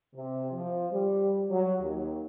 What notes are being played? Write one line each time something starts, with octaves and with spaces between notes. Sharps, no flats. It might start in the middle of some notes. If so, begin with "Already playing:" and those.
C3
F3
G3
F#3
D#2